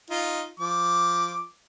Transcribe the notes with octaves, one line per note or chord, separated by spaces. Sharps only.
D#4 F4
F3 D6